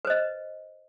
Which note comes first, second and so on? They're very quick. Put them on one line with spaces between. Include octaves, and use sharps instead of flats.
B4 C5 D#5